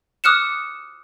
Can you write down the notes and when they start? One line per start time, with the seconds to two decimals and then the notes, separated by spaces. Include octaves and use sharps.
0.24 D6 D#6 F6 F#6 C#7 E7